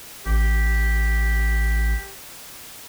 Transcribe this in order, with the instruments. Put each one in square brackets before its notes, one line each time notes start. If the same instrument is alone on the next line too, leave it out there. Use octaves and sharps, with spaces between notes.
[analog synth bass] A1 [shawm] G4